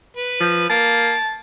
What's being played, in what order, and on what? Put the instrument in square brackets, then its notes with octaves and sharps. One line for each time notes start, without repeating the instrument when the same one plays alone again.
[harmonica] B4
[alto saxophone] F3
[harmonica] A#3 [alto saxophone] A5